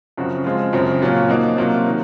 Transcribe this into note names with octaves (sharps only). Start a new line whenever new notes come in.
F#2 C#3 F3 C4 F#4
F3 G#3 C4 F4
F#2 C#3 F3 C4
A#2 F#3 C#4 F4
F3 A#3 D#4 F#4
C3 F#3 A#3 F4
D#3 F#3